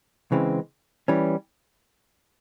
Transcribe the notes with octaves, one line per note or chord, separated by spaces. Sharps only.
C#3 E3 G#3 C4
E3 G3 C#4